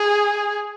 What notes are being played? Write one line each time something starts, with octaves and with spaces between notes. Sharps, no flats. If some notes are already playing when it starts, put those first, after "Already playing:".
Already playing: G#4